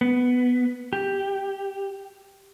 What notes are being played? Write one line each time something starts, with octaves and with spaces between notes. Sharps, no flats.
B3
G4